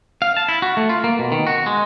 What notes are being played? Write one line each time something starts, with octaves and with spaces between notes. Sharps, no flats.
F5
A5
E4
F#4
A3
F4
A#3
B2
D#3
F#4
G#3